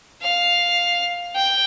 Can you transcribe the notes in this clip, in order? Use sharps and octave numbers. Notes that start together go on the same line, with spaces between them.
F5
G5